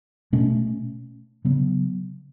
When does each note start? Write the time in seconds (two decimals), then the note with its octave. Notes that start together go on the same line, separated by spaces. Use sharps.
0.33 B2 A3 C#4
1.45 C#3 F#3 B3